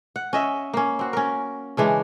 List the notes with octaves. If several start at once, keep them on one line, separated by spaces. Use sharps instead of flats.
F#5
C#4 D#5 E5
A#3 C#4
C4 F#4
C#4 A#4
C#3 E3 G#3 D4